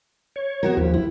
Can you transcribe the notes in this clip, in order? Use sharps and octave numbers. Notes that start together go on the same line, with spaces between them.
C#5
B3 F#4 A#4
D#2 F3 G4
E4